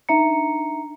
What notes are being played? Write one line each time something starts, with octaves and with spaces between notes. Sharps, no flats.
D4 D#4 E5 A#5 C#7